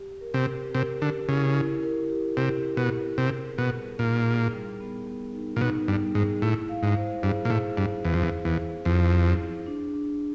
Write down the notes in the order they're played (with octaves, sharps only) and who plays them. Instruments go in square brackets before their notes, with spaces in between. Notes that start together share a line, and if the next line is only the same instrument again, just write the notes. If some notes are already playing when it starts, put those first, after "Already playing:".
Already playing: [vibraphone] G4
A#4
[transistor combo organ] C3
[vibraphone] G4
[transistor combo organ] C3 [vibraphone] A#4
[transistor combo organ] D3 [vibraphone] G4
[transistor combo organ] C#3 [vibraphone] E4
[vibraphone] E4
A#4
G4
[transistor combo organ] C3 [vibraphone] G4
[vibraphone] G4
[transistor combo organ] B2
[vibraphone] A#4
[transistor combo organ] C3 [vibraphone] G#4
[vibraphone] G#4
[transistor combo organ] B2
[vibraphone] G3
[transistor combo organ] A#2 [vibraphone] D#4
[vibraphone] G#4
G3
B3
B3
D#4
[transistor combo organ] A#2
[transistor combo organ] B2 [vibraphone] D#4
[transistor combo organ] G2 [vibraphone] G3
[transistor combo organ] G#2 [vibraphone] G#4
[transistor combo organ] A2 [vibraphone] E4
[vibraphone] F5
[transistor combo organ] G#2
[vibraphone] C5
[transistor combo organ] G2 [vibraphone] G#4
[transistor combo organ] A#2
[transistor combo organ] A2 [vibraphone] G#4
[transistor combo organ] G2 [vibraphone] C5
[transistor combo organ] E2 [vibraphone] E4
[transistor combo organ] F2
E2
[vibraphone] C5
[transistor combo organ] E2
[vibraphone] E4
[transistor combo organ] F2 [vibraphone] E4
[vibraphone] G#4
G#4
D4
D4